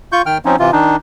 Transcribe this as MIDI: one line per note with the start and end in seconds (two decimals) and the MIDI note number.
0.12 0.22 65
0.12 0.22 85
0.12 0.22 91
0.26 0.38 51
0.26 0.38 79
0.26 0.38 89
0.45 0.56 53
0.45 0.56 60
0.45 0.56 61
0.45 0.56 63
0.59 0.71 48
0.59 0.71 52
0.59 0.71 65
0.72 0.96 51
0.72 0.96 62
0.72 0.96 63